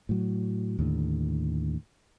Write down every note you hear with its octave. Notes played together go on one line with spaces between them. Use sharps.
A2 F#3
D#2 A2 D3